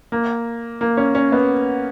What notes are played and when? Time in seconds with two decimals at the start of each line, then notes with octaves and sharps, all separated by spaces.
0.12 A#3
0.81 A#3
0.97 C#4
1.15 C#4
1.32 B3